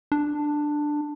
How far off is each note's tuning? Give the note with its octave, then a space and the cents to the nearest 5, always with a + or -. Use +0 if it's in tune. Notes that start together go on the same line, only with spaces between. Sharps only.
D4 +10